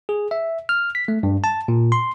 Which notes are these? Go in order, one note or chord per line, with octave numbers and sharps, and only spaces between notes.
G#4
E5
F6
B6
A3
G2
A5
A#2
C6